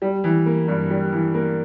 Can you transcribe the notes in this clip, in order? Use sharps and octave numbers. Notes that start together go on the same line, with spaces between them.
G3
E3
A#3
G2
G3
E3
A#3